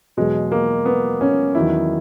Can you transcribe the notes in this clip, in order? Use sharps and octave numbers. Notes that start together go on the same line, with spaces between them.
E2 B2 F#3 G#3
A#3
B3
C#4
E2 D#3 F#3 E4